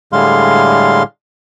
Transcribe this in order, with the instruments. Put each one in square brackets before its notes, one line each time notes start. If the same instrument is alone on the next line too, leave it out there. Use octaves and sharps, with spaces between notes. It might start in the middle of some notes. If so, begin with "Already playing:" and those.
[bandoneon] A2 D3 G3 G#3 F5 C6